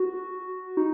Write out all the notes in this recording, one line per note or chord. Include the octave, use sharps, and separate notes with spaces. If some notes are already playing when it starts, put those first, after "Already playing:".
Already playing: F#4
D#4